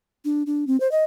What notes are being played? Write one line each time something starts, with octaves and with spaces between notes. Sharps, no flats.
D4
D4
C4
C5
D#5